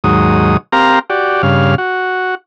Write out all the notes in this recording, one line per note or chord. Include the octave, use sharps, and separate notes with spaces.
D#2 G#2 F#3 D#6
C4 G4 A#4 F5 A#5
F#4 G4 D5
G2 C#3 F5
F#4